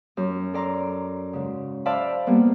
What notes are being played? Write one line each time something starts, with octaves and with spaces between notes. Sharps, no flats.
F#2
A4 D5 A#5 C6 D6
G#2 C#3
C5 D5 E5 F5 A5 B5
G3 A#3 B3